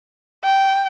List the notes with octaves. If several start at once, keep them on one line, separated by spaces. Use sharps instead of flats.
G5